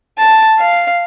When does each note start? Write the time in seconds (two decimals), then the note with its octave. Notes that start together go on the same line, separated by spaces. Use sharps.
0.18 A5
0.59 F5